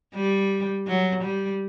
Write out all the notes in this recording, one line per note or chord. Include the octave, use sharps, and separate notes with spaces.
G3
F#3
G3